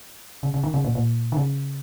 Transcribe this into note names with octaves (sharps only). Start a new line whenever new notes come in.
C#3
C#3
D#3
C#3
A#2
A#2
D#3
C#3